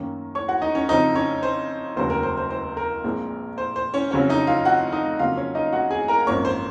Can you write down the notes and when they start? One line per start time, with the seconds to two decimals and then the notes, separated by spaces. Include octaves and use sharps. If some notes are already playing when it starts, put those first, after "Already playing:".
Already playing: F#2 D#3 A#3 C#4
0.35 C#5 C#6
0.48 F#4 F#5
0.62 D#4 D#5
0.75 C#4 C#5
0.89 F2 C#3 F3 C4 D#4 D#5
1.15 C#4 C#5
1.43 C5
1.96 F1 D#2 C#3 F#3 C#4 C5
2.10 A#4
2.23 C5
2.37 C5
2.51 C5
2.77 A#4
3.04 A#1 A#2 G#3 C4
3.58 C5
3.76 C5
3.94 C#4 C#5
4.11 F2 C#3 F#3 C#4 C#5
4.30 D#4 D#5
4.47 F4 F5
4.65 F#4 F#5
4.92 D#4 D#5
5.19 F2 C#3 F#3 A#3 F4 F5
5.37 C#4 C#5
5.55 D#4 D#5
5.73 F#4 F#5
5.91 G#4 G#5
6.08 A#4 A#5
6.26 G#1 F#2 F3 A#3 C#5 C#6
6.45 C5 C6